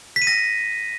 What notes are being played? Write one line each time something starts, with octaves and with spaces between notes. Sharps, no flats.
B6
D#7
A#6